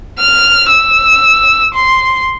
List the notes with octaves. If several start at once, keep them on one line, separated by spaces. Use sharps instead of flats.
F6
E6
C6